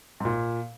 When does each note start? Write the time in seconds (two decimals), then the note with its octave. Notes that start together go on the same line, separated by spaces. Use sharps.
0.20 G#2
0.25 A#2